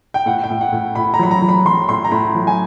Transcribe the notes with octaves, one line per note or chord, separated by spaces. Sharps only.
G5
A2 F#5
G5
A2
F#5
A2
A2 B5
A#5
F#3 B5
A#5
F#3
B5
F#3 C6
A2 C6
A#5
A2 B5
F#3
G#5